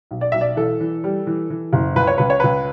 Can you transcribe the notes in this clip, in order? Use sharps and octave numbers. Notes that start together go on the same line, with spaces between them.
B1
D5
B1 E5
D5
E3 A4
E3
G3
E3
E3
F#1
C#2 B4
C#5
C#2 B4
C#5
C#2 B4